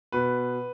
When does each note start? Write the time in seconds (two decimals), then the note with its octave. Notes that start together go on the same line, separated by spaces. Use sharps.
0.12 B2 B4